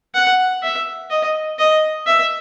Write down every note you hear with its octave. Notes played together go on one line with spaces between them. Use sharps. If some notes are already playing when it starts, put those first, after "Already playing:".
F#5
E5
D#5
D#5
E5